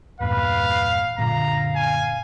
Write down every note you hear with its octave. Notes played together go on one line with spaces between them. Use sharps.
E2 G2 A#2 B4 F5
F#1 A#2 D3 F5 A#5
G#5